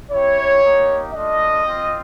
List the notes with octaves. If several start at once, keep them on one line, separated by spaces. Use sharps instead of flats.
C4 E4 G4 C#5
A#3 D#4 G4
A3 D4 F4 D#5
C4 F4